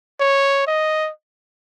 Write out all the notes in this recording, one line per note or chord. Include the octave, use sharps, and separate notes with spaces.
C#5
D#5